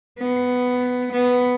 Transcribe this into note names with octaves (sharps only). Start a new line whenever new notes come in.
B3
B3